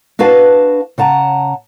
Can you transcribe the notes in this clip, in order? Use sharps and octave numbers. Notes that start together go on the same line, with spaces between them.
D4 F#4 B4 F5 A5
C#3 F#5 A5 A#5